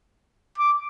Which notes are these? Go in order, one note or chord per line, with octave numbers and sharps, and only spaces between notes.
D6